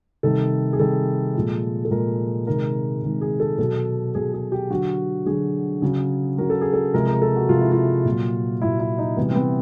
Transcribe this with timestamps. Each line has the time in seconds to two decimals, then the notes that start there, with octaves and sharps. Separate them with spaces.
0.23 C3 D#3 G3 A4
0.73 G#4
0.79 C3 D#3 G3 A4
1.35 A#2 F3 G#3
1.85 A4
1.91 A#2 F3 G#3 A#4
2.47 C3 D#3 G#3 A#4
3.02 C3 D#3 G#3
3.21 G#4
3.40 A4
3.58 B2 F#3 A4
4.15 B2 F#3 G#4
4.34 G#4
4.52 G4
4.70 D3 F#3 F#4
5.26 D3 F#3 G#4
5.82 C#3 F#3
6.38 C#3 F#3 A#4
6.50 A4
6.61 G#4
6.74 A4
6.94 C3 F3 G#3 A#4
7.08 A#4
7.22 A4
7.36 F#4
7.49 C3 F3 G#3 F4
7.61 E4
7.72 F4
8.05 A#2 F#3
8.62 A#2 F#3 E4
8.80 E4
8.98 D#4
9.17 C3 E3 G3 B3
9.30 C4
9.35 B3